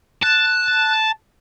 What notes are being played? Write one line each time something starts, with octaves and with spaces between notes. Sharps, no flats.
A5 F#6